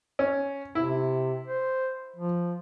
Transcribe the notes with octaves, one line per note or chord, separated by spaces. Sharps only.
C#4
C3 E4
C5
F3